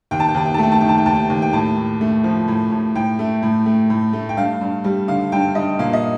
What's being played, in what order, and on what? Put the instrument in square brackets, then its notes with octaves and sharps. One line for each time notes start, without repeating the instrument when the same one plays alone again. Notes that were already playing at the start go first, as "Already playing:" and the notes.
[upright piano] D#2 G5
A5
G5
D#2 A5
G5
A5
A3 G5
A5
D#3 G5
A5
G5
D#2 A5
G5
D#2
G5
A2 A5
A2
A3
F3
A2
A2
A2 G5
A3
A2
A3
A2
A3
G5
G2 F5
G2
G3
D3 F5
G2 G5
G2 D#5
A#2 F5
D#5